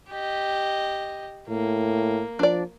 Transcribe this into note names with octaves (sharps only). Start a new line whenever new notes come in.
G4 D#5
A2 A#3
F3 D4 D5